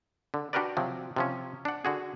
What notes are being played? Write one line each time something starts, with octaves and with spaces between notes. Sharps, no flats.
D3
D4 F#4 G4 A#4 B4 D5
C3 F3 F#3
C3 F3 C#4
D4 F#5
D3 F#4 G#4